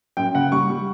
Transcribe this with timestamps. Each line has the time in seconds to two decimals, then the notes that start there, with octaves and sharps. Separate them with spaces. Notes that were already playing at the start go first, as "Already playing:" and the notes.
0.17 F#2 G5
0.35 C#3 F#5
0.52 G3 C#6
0.70 G3